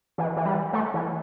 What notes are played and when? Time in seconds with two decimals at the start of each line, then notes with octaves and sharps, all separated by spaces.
0.18 E3
0.36 E3
0.45 G3
0.73 A3
0.94 E3